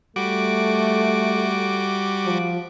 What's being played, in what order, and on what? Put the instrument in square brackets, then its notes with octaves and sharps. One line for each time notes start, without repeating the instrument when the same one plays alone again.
[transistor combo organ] G3 F#4 D6 [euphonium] A3
[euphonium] F3